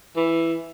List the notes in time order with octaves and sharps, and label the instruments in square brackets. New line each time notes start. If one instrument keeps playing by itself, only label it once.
[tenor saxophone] E3